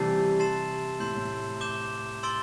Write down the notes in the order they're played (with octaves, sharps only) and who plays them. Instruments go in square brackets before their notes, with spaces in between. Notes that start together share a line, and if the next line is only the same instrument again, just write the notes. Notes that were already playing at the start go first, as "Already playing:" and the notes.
Already playing: [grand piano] C3 E3 G3 A3 [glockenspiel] A5 E6 A6 C7
[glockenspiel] A5 C6 A6 C7 E7
[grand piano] A2 [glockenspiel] C6 G6 C7 E7
[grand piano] A2
[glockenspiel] D6 G6 E7 G7
C6 E6 A6 D7 G7